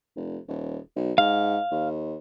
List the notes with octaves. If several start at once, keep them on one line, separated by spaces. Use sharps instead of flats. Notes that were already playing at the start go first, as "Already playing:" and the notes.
F1
D#1
B1
G#2 F5
D#2